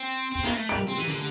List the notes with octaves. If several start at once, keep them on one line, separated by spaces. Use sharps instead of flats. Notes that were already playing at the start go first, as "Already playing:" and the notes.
Already playing: C4
C4
A#3
A3
G3 D7
C4
E3
D3